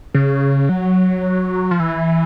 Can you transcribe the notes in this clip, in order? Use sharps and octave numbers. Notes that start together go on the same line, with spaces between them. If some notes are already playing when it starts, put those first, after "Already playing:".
C#3
F#3
F3
E3